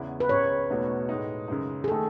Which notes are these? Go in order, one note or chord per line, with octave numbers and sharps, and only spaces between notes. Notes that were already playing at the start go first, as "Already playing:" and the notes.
Already playing: E2 C#3 G#3 B3 E4
B4
C#2 C#3 G#3 C#5
E2 B2 A3 D#4
A2 G#3 D#4
F#2 C#3 G#3 D#4
G#4
D#3 A3 D#4 A4